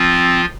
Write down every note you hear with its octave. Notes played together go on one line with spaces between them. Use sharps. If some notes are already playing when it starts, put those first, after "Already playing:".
Already playing: F3 C4 F4